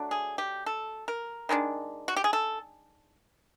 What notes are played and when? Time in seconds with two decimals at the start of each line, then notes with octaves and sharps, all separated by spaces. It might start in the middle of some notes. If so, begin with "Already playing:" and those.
Already playing: F#3 A3 D4
0.11 G#4
0.38 G4
0.66 A4
1.08 A#4
1.49 D#3 G#3 B3 D4
2.08 F#4
2.16 G4
2.24 G#4
2.33 A4